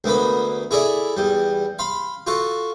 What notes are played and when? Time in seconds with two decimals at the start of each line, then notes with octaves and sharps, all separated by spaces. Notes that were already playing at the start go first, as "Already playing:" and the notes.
0.04 D2 A#3 B3 B5
0.71 E4 G#4 A4 D5 E5
1.17 E2 G3
1.79 F5 B5 C6
2.27 F4 F#4 A4